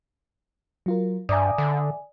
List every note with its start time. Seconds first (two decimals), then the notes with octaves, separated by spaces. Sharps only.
0.86 F#3 F4 A#4
1.29 G2 D5 E5 G#5 A#5 D6 D#6
1.58 D3